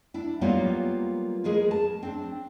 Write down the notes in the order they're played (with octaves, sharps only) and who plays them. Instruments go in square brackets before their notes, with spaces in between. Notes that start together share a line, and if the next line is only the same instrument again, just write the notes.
[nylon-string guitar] D4 E4
F#3 G3 A#3 B3 F4
G#3 G#4 A#4 B4
A5
C4 D4